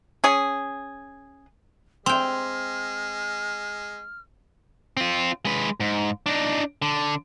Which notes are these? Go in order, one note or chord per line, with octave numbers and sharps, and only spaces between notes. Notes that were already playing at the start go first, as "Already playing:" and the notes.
C#4 G#4
G#3 C4 G5 C6 F6
C4 F4
G#3 B4
G#2
D4 D#4
D3